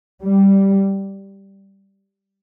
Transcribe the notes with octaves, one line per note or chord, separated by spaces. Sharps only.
G3